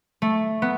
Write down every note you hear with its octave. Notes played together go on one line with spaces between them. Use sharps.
A3
B3